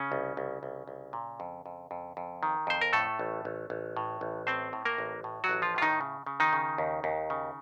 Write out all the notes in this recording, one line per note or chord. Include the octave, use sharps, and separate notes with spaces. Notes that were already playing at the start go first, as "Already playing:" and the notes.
Already playing: C#3 C#4
C2
C2
C2
C2
A#2
F2
F2
F2
F2
D#3
F2 C5
A#4
A2 A3 A4
A1
A1
A1
A2
A1
A2 C4 C5
A2
A#3 A#4
A1
A2
F#3 F#4
A1
F3 F4
A2 F4
D#3 D#4
C#3
C#3
D#3 D#4
C#3
D#2
D#2
C#3